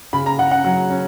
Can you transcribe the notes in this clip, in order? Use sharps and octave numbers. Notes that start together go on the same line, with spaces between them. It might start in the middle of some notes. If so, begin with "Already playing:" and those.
C#3 B5
A#5
C#3 F#5
F#5
F#3
C#4